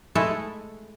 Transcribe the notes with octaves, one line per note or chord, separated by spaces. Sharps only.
G#3 A3 E4 A4 D#5 A5